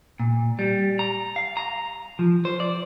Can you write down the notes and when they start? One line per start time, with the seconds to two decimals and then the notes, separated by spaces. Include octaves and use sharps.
0.20 A#2
0.59 G3
0.99 A#5
1.36 F5
1.57 A#5
2.19 F3
2.45 C5
2.60 D5